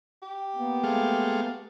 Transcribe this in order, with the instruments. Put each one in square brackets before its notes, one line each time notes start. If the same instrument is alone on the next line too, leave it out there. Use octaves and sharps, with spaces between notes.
[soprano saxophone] G4
[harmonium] A#3 B3
[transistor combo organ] G#3 A3 F5